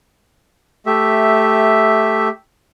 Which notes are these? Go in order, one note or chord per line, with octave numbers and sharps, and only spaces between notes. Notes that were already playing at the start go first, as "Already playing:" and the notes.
A3 G4 E5